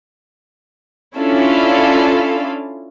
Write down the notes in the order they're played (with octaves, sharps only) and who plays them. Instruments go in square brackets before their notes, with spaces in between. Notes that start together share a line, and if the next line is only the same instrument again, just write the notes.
[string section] C#4 D4 E4 F4 A4 F5